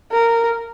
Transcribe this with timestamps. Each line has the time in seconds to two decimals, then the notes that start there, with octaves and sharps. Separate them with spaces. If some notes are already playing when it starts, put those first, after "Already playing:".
0.12 A#4